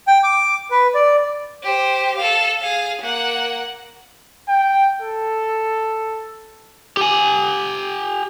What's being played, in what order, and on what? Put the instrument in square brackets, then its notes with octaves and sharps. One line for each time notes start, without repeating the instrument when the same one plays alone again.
[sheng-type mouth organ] G5
D6
B4
D5
[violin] G4 C5
A4 F5
G#4 F5
A#3 F#5
[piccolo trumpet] G5
A4
[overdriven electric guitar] G4 G#5